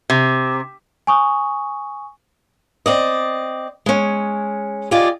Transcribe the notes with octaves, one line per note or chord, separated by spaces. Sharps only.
C3
G#5 C#6 D#6
C4 D5 D#5
G#3 C#4
F4 G4 G#4 D5 D#5